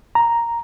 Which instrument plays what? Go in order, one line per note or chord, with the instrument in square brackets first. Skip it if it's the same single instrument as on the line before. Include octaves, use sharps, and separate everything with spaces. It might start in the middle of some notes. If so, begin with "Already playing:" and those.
[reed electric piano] A#5